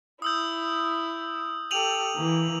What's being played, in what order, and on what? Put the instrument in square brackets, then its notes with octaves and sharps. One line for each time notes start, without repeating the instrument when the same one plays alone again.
[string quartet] E4 [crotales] D#6 E6 G6
[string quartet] G4 A4 [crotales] D#7 F7 F#7
[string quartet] E3 A#3